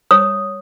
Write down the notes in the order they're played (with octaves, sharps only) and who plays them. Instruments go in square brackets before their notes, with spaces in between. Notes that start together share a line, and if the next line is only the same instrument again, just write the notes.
[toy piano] C#5 D#6